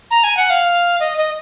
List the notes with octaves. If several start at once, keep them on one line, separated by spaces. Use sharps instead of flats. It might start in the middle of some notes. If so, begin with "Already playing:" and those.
A#5
G#5
F#5
F5
D#5
D#5